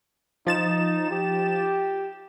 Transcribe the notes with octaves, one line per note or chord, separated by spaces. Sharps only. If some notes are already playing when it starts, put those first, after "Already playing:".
F3 D#4 A6 E7
G4